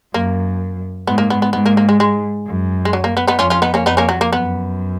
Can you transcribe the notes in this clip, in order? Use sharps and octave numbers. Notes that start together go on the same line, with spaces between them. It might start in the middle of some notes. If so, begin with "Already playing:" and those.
F#2 A#3
G#2 B3
A#3
B3
B3
G#2 B3
A#3
A#3
G#3
G#3
F#2
G#3
F#3
A#3
B3
B3 D#4
F2 C#4 F4
C#4 F4
B3 D#4
A#3 C#4
F2 B3 D#4
A#3 C#4
F#3
A#3
F#2 B3